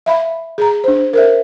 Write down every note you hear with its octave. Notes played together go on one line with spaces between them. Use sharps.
E5 F5 B5
G#4 A#5
D4 C5
A#4 C5 E5